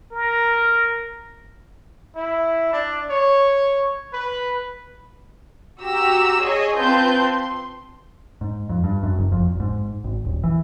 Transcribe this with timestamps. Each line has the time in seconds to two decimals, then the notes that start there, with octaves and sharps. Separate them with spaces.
0.12 A#4
2.15 E4
2.73 D4
3.10 C#5
4.13 B4
5.81 F#4 G4 A#5 E6
6.42 G#4 C#5 D#5 G#5
6.77 C4 F4 B4 A5 C6 G6
7.23 C6
8.41 G#2
8.69 F2
8.84 G2
9.03 F#2
9.18 F#1
9.32 F2
9.46 G#1
9.60 G#2
10.04 G#1
10.25 D#1
10.44 E3